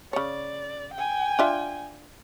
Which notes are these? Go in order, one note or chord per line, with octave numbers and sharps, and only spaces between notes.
C#3 C#5 D5
G5 G#5
D4 F4 E5